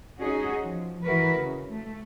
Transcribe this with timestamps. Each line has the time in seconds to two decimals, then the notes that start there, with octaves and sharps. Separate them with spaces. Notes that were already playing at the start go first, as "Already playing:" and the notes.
0.21 C#4 D#4 F#4 G#4
0.61 F3
1.04 E3 E4 F#4 A#4 B4
1.37 C#3
1.69 A3